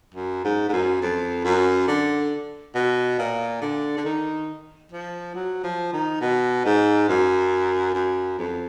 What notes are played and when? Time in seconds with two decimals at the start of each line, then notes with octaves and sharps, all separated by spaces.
0.15 F#2
0.45 G#2
0.69 G#2
0.73 F#2
1.02 F2
1.44 F#2
1.88 D3
2.75 B2
3.19 A#2
3.62 D3
3.97 D3
4.05 D#3
4.92 F3
5.35 F#3
5.64 F3
5.93 D#3
6.21 B2
6.65 G#2
7.09 F#2
7.95 F#2
8.39 F2